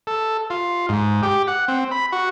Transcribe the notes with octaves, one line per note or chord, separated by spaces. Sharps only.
A4
F4
G#2
G4
F#5
C4
B5
F#4